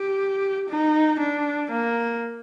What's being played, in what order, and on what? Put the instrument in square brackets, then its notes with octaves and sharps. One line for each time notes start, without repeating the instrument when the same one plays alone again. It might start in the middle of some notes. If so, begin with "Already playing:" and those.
Already playing: [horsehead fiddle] G4
D#4
D4
A#3